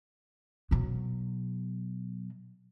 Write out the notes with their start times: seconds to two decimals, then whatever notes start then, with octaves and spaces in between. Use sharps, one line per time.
0.71 B2 F#3